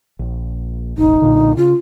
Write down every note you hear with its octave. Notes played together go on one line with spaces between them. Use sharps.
A#1
E1 A1 D#4
B1 A#2 D3
C#3 F4